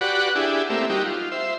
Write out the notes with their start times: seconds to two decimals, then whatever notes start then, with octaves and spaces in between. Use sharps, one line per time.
0.01 F#4 G4 B4 D5 F#5
0.36 D4 E4 G4 G#4
0.70 A3 A#3 C4 G4 E5
0.90 G3 D#4 F#4 G4
1.05 F4
1.32 C5 E5